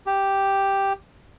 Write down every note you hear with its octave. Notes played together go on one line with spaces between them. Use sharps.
G4